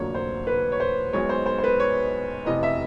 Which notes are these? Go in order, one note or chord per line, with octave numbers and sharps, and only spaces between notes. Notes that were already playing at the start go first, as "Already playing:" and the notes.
Already playing: F1 F2 D3 F#3 A#3 C#5
C5
B4
C#5
C5
B1 B2 G#3 C#5
C5
C5
C5
B4
C#5
F1 E2 C3 D#5
E5